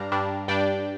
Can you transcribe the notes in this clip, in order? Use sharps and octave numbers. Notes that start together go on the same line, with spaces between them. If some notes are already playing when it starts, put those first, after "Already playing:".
Already playing: G2 G3 D4 F5 A#5
G2 G3 D4
G2 G3 D4 D5 G5